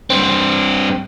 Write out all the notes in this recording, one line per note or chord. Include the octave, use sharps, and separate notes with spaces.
G2 C4